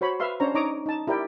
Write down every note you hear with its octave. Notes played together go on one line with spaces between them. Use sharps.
F#4 C5 C#5 B5
B4 E5 F5 C6
C#4 D4 C5 C#5 A#5
D#4 C#5 A#5 D6 D#6
D#4 A5
E4 G4 A#4 D5 G5